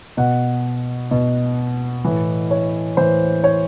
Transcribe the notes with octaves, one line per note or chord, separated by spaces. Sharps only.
B2 F#5
B2
A2 E3
C#5
A2 E3 C5
C#5